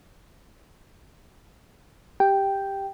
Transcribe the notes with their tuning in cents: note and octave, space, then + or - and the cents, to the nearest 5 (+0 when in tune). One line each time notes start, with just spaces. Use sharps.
G4 +5 G5 +0